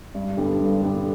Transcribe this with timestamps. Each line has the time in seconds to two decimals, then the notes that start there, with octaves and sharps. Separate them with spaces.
0.15 G2
0.37 D3 G3 B3 D4
0.59 G2
0.81 D3 G3 B3 D4